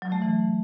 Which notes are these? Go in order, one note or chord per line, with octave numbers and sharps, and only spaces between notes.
F#3
A3
E3